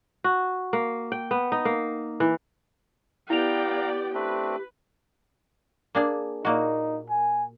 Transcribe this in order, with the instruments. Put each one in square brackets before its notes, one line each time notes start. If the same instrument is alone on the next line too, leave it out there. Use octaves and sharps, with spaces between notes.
[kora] F#4
A#3
G5
B3
D#4
A#3
E3
[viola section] B3 D5 G5 [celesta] E4 F7 [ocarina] G4 [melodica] F5 A#5
[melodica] A3 C4 D4 [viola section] B4
[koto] A#3 D4 G#4
[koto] A#2 A#3 F#4 [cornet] D#4
[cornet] G#5